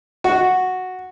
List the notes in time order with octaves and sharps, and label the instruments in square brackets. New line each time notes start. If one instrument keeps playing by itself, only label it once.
[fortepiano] F#4